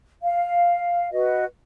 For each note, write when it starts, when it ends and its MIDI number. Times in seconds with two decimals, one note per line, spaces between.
0.23 1.11 77
1.12 1.44 66
1.12 1.44 71
1.12 1.44 75